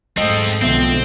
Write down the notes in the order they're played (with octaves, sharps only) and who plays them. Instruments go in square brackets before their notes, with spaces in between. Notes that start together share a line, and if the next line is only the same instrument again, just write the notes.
[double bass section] G#2 [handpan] G#3 A3 D#5 [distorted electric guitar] C4 A4
[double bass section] B1 D3 F3 [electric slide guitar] B3 E5 [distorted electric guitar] C4